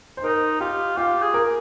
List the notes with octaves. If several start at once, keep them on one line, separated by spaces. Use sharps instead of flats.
C5
D#4 A#4
F4 G4
F4 G4
G#4
A#4